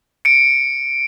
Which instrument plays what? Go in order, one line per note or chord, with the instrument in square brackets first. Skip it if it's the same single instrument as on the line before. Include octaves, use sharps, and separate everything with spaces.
[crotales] C#7 D7